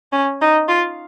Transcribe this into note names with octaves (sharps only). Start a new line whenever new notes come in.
C#4
D#4
F4